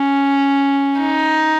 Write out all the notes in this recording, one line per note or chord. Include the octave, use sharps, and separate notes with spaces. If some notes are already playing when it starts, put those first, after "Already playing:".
Already playing: C#4
D#4